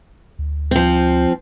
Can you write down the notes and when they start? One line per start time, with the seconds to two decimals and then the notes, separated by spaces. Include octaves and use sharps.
0.39 D2
0.71 F3 C4